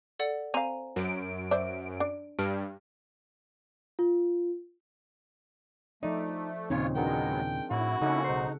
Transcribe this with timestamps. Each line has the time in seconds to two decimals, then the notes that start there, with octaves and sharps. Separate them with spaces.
0.19 A4 D5 F#5
0.54 C4 F5 G#5 A#5 D#7
0.96 F#2 D7
1.51 C5 D5 E5
2.00 D4
2.39 G2 F6 D7
3.99 F4
6.03 F3 A3 D#4 D5
6.70 D#2 A#2 C#3 C4 D#4 F4 C#5
6.95 F#3 G#3 B3 D4 G#4 A#4 G5
7.71 A2 E4 F#4
8.01 C#3 A#3 C#4 D#4 E4 A4 F#5
8.24 B1 D#4 C5